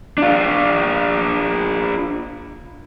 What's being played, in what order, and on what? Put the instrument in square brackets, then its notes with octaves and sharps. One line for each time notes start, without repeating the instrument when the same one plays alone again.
[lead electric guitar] D4 F4